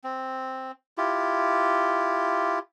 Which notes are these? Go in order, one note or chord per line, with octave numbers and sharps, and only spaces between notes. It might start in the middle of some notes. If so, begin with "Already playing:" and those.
C4
E4 F4 G4